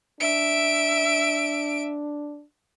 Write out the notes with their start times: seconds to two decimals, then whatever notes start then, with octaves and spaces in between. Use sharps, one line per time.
0.21 D4 E5 D7